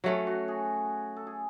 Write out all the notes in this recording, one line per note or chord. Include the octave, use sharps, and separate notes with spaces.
F#3 A3 C#4 F#4
F#4
G#4
A4
G#4